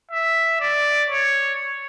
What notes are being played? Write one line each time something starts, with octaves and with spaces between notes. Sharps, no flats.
E5
D5
C#5